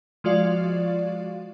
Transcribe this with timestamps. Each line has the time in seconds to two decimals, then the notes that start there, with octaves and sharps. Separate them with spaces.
0.24 F3 G#3 F4 F#4 D5 F5